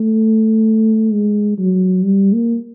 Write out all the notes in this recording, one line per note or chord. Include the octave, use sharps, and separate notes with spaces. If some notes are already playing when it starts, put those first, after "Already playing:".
Already playing: A3
G#3
F#3
G3
A#3